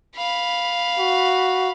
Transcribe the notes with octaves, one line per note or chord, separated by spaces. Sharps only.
F5 B5
F#4